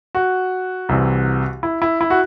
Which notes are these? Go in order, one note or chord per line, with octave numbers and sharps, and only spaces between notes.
F#4
C2 C3 E3
E4
E4
E4
F#4